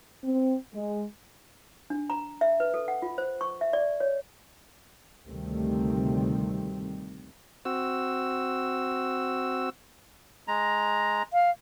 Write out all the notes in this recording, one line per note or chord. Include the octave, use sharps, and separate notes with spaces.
C4
G#3
D4
A#5
E5
B4
A4
F#5
F4
C5
C#6
E5
D5
C#5
D2 C3 D#3 G3 A3 C4
C4 F#4 E6
G#3 A#5
F5